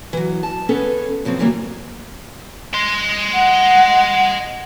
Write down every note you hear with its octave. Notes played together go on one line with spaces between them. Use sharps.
E3 F#3
A5
B3 C#4 G#4 A4 B4
C#3 F3 F#3 C4
C#3 E3 F#3 G3 A#3
D#5 C6
F#5